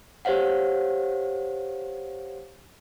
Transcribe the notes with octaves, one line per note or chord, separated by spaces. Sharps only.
G4 C5 C#5 F5 F#5